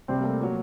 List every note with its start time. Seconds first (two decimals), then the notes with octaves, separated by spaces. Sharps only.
0.08 C3 G3 C4
0.19 A#3
0.24 A3
0.40 A#2 F#3 A#3